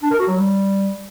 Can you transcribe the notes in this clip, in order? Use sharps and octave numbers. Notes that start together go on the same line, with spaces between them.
D4
A#4
F#4
F#3
G3